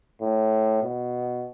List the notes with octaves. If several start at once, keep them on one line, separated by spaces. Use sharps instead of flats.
A2
B2